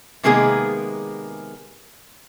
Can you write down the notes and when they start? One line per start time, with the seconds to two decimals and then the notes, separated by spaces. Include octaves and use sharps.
0.23 C3 D#3 G#3 A#3 B3 G#4